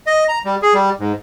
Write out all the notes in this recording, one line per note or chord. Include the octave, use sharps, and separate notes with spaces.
D#5
A#5
G3
G#4
G3
G#2